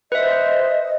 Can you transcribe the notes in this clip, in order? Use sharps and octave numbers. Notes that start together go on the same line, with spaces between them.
B4 C5 D#5 E5